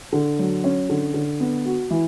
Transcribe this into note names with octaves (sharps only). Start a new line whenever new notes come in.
D3
F#3
C#4
D3
D3
B3
F#4
E3